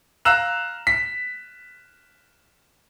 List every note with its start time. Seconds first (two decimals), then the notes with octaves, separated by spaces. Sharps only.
0.25 F5 A#5 E6 F#6 E7
0.87 B6